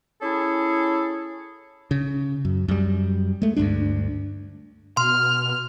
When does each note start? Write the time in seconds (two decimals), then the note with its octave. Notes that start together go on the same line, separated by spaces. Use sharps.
0.22 C#4 E4 G#4 A4
1.91 C#3
2.45 F#2
2.68 F#2 G3
3.42 G#3 A3
3.56 D2 G2 G#3 D4
4.97 B2 C6 F6